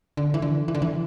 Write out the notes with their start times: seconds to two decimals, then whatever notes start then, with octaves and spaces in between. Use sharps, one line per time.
0.17 D3
0.34 E3
0.42 D3
0.68 E3
0.75 D3
0.82 E3